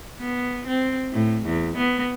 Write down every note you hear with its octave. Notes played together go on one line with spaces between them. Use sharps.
B3
C4
A2
E2
B3